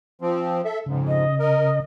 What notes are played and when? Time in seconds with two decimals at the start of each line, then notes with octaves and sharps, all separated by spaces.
0.21 F3 C4
0.65 A4 E5
0.86 F2 G#2 C#3
1.07 D#5
1.39 A#4 D#5